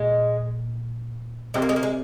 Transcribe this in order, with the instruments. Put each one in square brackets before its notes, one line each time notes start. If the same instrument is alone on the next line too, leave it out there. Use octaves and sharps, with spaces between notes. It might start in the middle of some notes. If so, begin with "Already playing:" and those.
Already playing: [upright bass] A#2 [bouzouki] G#3
[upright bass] C3 [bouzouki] G#3
[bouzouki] A#3
G#3
A#3
G#3